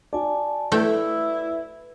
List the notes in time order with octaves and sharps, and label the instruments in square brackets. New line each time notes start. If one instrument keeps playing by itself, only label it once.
[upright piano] F#4 D5 [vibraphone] G#5 A5
[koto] A3 G5 [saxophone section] E4 [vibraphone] B4